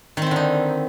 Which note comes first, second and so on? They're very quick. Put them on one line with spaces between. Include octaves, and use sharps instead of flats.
D#3 C4 E4 D3 D#4